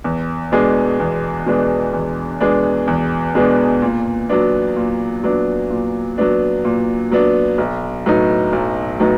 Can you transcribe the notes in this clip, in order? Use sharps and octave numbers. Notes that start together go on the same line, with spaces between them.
E2
B2 G#3 B3 D4
E2
B2 G#3 B3 D4
E2
B2 G#3 B3 D4
E2
B2 G#3 B3 D4
A#2
F#3 B3 D4
A#2
F#3 B3 D4
A#2
F#3 B3 D4
A#2
F#3 B3 D4
B1
A2 F#3 B3 D#4
B1
A2 F#3 B3 D#4